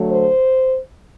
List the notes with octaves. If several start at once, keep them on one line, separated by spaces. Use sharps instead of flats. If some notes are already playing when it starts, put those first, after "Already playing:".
Already playing: D3 F#3 A3
C5